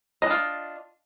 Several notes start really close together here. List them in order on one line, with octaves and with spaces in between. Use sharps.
D#5 D4 F4